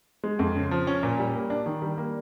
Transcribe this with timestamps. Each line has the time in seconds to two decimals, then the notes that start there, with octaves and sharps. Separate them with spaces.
0.24 G#3
0.39 F2
0.55 C#3
0.71 F3
0.87 C#4
1.03 A#2
1.19 G3
1.35 A#3
1.50 D4
1.66 D#3
1.82 G3
1.98 A#3